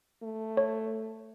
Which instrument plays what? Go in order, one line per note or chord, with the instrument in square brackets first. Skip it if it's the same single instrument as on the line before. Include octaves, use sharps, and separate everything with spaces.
[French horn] A3
[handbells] C#5